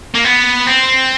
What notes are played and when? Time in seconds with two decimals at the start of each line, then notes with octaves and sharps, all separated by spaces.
0.14 A#3
0.24 B3
0.67 C4